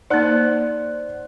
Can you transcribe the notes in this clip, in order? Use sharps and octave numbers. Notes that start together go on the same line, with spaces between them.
A#3 D#4 C5 D5 F#5 F#6